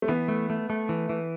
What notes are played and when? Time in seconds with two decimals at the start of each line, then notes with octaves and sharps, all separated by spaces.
0.02 A3
0.08 E3 B3
0.28 A3
0.50 A3
0.70 A3
0.89 E3
1.09 E3